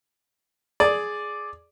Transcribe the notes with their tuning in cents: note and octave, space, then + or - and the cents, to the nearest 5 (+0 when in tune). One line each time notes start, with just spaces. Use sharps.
G#4 +10 D5 +0